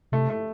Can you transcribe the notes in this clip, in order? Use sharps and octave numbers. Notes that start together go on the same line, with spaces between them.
C3 A3
A3